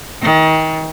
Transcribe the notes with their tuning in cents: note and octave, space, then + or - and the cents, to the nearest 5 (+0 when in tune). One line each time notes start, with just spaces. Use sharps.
D#3 +30